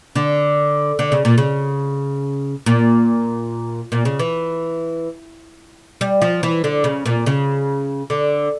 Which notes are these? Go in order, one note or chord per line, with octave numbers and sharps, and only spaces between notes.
D3
D3
C#3
A#2
C#3
A#2
A#2
C#3
E3
G3
F3
E3
D3
C#3
A#2
C#3
D3